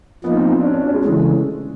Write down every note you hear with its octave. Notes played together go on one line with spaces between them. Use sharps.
F3 A#3 B3 D#4
C4
C4
D4
C#4
D4
C#4
G#3
C#3 E3 G#3 A3